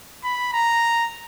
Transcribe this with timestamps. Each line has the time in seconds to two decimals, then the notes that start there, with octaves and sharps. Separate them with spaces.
0.24 B5
0.53 A#5